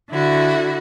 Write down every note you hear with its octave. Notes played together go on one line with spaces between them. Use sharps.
D3 E4 F#4